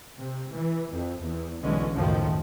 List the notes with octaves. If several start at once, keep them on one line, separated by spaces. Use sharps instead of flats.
C3
E3
F2
E2
B1 D3 E3 G#3 C#4
C#2 F#2 A2 D#3 F3